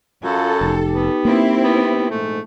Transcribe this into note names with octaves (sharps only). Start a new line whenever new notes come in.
F#2 F4 A4
F1 D#4 G4
B3
A#3 C4 E4
B3
A#1 G#2 A3